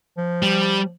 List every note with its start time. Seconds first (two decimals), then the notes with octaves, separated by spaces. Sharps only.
0.17 F3
0.43 G3